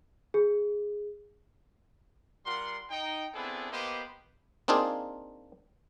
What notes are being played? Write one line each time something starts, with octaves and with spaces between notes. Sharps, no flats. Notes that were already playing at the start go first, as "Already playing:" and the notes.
G#4
G3 F4 A#4 F#5 C6
D#4 G5
B3 C4 D4 E4 G#4 A4
A#3 B3 G4 B4 C5 D#5
A#3 C4 D4 D#4 F4 G#4